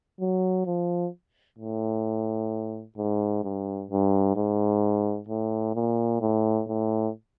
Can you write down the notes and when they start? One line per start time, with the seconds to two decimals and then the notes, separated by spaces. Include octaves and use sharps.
0.20 F#3
0.66 F3
1.59 A2
2.97 G#2
3.44 G2
3.90 G2
4.36 G#2
5.29 A2
5.75 A#2
6.21 A2
6.68 A2